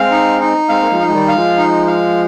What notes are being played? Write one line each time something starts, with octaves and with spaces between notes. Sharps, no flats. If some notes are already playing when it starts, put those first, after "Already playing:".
Already playing: G#3 C4 F5
D#4
D#4
G#3 C4 F5
A#3
F3 G#3
D#4
G#3
D#3 G3
F5
F3 G#3
D#4
F5